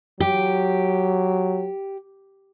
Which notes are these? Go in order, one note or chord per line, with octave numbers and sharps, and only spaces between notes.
F#3 G4